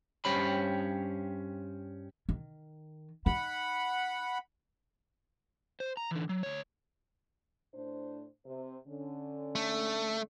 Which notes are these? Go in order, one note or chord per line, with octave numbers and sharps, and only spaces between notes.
G2 C#4 G4 C5 C#5 B5
D#3
D#4 F#5 B5
C5
A#5
D3 E3
F#3
D2 C#5
A2 D4 C5
C3 C5
D3 C#4
A3